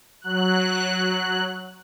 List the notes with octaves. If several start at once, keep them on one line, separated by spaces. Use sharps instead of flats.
F#3 F#6